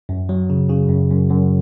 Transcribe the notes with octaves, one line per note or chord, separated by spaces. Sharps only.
F#2
F#3
C#3
C#3
F#2
F#2
F#2